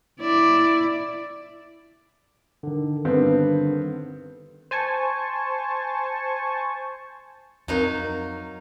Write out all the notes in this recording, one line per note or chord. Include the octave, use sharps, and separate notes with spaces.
E4 D5
D3 D#3
G2 D3 D#3 B3 C4
C5 G#5 A5 C#6
F2 F#3 C4 D#4 A#4 F5